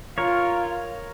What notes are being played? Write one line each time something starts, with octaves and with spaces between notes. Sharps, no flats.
F4 A#4 C#5